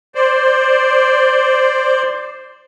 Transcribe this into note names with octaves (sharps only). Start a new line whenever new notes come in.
C5 D5